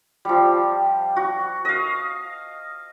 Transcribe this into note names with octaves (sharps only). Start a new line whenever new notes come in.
F3 G3
F#4
D#5 F5